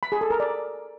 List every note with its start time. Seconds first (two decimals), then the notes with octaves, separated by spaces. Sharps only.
0.03 B5
0.12 G#4
0.21 A4
0.30 A#4
0.40 D5